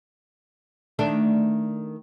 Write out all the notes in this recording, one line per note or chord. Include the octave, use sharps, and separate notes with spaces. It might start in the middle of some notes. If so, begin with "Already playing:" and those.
D#3 A3 D4